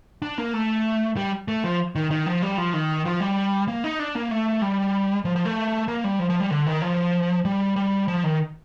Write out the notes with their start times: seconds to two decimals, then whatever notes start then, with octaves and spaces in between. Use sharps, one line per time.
0.22 D4
0.38 A#3
0.54 A3
1.17 G3
1.48 A3
1.64 F3
1.95 D#3
2.11 D#3
2.26 F3
2.42 G3
2.58 F3
2.74 D#3
3.06 F3
3.20 G3
3.68 A#3
3.84 D#4
3.99 D4
4.15 A#3
4.31 A3
4.62 G3
5.25 F3
5.36 F3
5.45 A3
5.88 A#3
6.04 G3
6.19 F3
6.30 F3
6.40 G3
6.51 D3
6.67 D#3
6.82 F3
7.45 G3
7.76 G3
8.08 F3
8.24 D#3